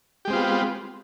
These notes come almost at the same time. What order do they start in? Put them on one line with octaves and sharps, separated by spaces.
G4 G#3 C4 F4 B3